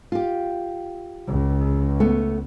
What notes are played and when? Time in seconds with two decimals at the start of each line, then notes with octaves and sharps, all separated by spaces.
0.12 F4 G4
1.28 C#2
2.00 A3 B3